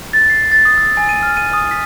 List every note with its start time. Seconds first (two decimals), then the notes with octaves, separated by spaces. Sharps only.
0.13 A6
0.30 C7
0.52 A6
0.65 D#6
0.78 E6
0.97 G#5
1.09 D#7
1.23 F6
1.37 D#7
1.53 D#6
1.71 B6